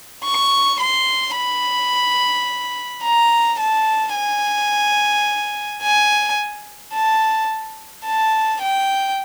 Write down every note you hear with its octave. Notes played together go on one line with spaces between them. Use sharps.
C#6
C6
B5
A#5
A5
G#5
G#5
A5
A5
G5